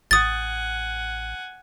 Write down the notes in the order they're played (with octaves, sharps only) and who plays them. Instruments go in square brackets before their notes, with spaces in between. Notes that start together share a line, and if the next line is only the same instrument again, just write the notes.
[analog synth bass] A1 [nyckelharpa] F#5 G#5 [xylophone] D#6 A6